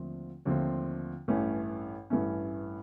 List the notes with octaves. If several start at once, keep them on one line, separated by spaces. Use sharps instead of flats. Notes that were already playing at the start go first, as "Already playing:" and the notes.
Already playing: D#2 D3 F3 A3 C4
D#2 D3 F3 A3 C4
A1 G2 E3 A3 C#4
A1 G2 E3 A3 C#4